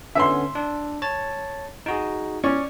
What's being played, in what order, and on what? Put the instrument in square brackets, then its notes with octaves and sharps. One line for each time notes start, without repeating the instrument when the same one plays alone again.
[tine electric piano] D3 B3 C#4 [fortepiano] E5 C6
[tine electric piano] D4
C#5 A5 A6
D#4 F#4 G#4
[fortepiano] C#4 [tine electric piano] D5 C#6